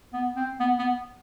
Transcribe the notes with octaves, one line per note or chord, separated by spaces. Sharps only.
B3
C4
B3
B3